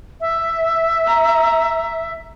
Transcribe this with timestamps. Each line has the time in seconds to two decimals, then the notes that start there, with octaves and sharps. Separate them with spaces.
0.21 E5
1.07 A#5